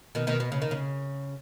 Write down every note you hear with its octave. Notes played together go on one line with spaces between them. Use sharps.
B2 D#3
B2 D#3
B2
C#3
D#3
C#3